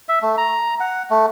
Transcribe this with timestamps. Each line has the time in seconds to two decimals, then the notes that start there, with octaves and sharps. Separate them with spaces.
0.09 E5
0.22 A3
0.38 A#5
0.80 F#5
1.10 A3